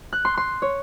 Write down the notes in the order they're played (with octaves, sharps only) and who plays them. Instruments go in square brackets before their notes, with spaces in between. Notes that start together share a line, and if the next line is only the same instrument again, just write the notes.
[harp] F#6
C6
C6
C#5